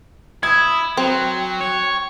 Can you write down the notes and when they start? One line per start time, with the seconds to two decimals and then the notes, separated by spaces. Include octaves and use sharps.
0.43 E4 D#6 G#6
0.97 F#3 C4 G5
1.60 C#5